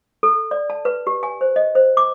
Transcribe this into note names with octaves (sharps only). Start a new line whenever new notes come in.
A4
D5
A5
B4
G4
G#5
C5
D#5
C5
D6